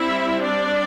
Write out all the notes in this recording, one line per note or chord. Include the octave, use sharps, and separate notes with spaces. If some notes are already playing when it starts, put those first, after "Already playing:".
Already playing: G3 C4 E4 E5
D4 D5